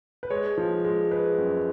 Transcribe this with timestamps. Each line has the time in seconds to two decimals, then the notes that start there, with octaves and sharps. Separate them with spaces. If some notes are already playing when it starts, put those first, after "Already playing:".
0.23 B4
0.30 G#3 C#5
0.58 F3
0.85 G#3
1.11 G#3 B4
1.38 F#2